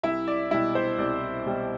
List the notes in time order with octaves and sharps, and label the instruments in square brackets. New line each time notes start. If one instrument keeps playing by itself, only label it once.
[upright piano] C2 E4 E5
D5
B2 G3 E4 E5
C5
C2 D5
B2 G3